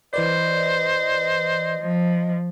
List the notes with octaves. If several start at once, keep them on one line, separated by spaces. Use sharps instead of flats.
E3 B4 C5 D5 D#5
F3